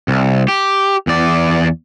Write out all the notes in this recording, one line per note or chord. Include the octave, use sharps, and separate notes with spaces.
C2
G4
E2 D5